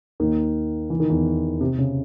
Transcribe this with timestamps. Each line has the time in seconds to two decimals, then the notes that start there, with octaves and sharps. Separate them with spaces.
0.20 D#2 D#3
0.90 E3
1.00 D#3
1.10 E2 E3
1.61 C3
1.78 C#3